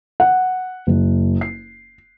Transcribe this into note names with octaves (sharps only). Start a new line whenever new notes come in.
F#5
F#1
C7